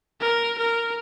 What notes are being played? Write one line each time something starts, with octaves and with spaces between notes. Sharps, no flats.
A#4
A#4